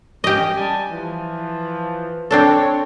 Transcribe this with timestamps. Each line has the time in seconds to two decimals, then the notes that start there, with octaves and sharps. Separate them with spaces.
0.24 C#4 G4 D#5
0.56 G3 G#5 A5
0.90 E3 F3
2.31 C4 D4 A4 C#5